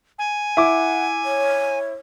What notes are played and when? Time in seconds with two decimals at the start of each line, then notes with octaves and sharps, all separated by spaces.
0.19 G#5
0.57 E4 F#5 D6
1.25 C#5